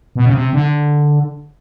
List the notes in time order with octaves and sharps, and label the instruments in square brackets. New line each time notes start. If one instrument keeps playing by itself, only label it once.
[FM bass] B2
C#3
C3
D3